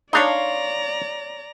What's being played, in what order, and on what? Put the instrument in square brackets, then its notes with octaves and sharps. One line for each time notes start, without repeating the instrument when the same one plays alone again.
[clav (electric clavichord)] D4 D#4 [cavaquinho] C#5 F5 C6 [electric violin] D5 A#5